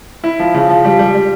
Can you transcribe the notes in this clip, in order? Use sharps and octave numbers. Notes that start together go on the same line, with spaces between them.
E4
F3
C#3
F3
G3
G3
G3